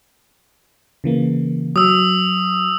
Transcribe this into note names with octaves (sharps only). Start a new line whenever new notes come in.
C#3 E3 A#3
F#3 D#6 E6